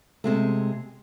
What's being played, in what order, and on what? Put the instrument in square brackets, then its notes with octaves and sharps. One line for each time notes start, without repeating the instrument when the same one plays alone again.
[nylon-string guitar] C3 G#3 A3